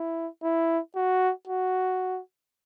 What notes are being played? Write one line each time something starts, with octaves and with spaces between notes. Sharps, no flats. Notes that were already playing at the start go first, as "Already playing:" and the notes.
Already playing: E4
E4
F#4
F#4